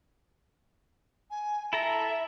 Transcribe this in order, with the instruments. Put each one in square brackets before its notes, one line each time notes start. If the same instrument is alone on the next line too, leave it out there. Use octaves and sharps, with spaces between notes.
[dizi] G#5
[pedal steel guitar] E4 A4 A#5 [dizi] E5